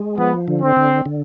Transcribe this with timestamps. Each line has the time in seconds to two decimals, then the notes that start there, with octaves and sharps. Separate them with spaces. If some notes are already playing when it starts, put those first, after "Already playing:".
Already playing: G#3
0.18 F3 B3
0.48 D3
0.62 C4
0.77 D3
1.06 D3